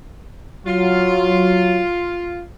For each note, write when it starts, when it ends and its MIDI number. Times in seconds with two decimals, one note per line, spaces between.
0.66 1.82 54
0.66 2.42 65